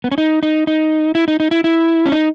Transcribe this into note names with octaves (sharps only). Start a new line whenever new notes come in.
B3
C#4
D#4
D#4
D#4
E4
D#4
D#4
E4
E4
C#4
D#4